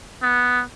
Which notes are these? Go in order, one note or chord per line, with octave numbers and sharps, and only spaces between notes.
B3